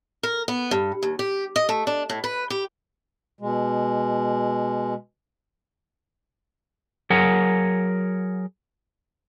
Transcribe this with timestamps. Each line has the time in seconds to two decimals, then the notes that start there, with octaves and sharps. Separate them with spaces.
0.23 A#4
0.48 B3
0.71 G2
1.03 D#2
1.19 G4
1.56 D#5
1.69 A3
1.87 D4
2.10 A2
2.24 B4
2.50 G4
3.41 B2 G#3
7.10 F#3 G#4 A#4 F#5